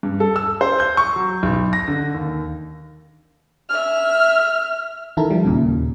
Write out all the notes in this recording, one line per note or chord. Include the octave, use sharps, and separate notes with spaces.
G2
A4
E6
C5
G6
C#6
F#3
B1
A#6
D3
D#2
E5 F6
D#3 E3 E4 A4 A#4
F3 G3
D#2 A#2 C#3